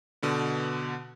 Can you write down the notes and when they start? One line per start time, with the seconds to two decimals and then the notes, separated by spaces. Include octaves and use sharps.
0.23 B2 D3 B3